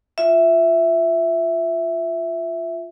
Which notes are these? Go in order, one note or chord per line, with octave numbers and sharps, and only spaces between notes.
F4 E5